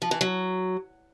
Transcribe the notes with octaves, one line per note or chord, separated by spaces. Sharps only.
F3
E3
F#3